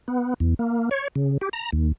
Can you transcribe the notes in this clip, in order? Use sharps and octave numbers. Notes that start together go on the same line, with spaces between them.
B3
E2
A#3
C#5
C#3
G4
A#5
D#2